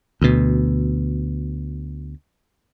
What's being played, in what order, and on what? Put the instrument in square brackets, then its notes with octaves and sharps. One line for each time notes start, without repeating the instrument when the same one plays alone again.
[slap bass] D2 B2